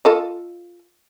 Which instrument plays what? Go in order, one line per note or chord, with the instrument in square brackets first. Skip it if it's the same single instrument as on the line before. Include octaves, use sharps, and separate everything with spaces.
[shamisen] F4 A4 D#5